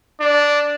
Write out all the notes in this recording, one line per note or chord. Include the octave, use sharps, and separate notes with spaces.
D4